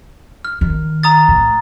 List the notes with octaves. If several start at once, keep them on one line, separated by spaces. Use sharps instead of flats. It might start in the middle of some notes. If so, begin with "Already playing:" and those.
F6
D#3
A#5 D#6 A6
A2